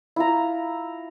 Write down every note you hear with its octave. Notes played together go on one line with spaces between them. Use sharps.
E4 F4 A#5